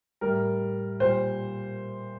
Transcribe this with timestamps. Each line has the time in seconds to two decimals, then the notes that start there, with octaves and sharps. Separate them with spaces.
0.21 A2 G3 A#4
1.00 A#2 G3 C5